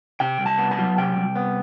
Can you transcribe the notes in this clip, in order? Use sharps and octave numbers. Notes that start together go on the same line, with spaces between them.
C3 G5
C2
A5
B3
A5
F#3
C3 G5
C2
B3